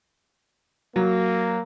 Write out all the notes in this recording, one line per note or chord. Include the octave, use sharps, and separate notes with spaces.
F#3 A#3